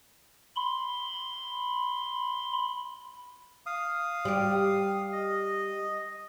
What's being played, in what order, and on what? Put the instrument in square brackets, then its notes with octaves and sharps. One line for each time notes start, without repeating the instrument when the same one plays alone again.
[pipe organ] B5 C6
[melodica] F5 D#6
[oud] G3 G4
[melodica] D#5